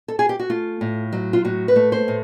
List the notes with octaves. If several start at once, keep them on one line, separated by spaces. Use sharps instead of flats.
A4
G#4
G4
F#4
A3 F4
A2
F#3
F4
A2 F#4
B4
A3
C5
A2